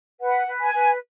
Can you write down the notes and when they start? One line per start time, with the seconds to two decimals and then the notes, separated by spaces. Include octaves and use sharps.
0.21 B4 F#5
0.47 B4
0.61 G#5
0.74 B4